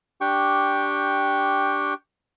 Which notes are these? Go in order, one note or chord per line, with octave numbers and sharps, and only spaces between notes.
D4 G4 G5 C#6